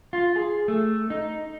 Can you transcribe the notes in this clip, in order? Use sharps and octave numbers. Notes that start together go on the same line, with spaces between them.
F4
G#4
A3
D#4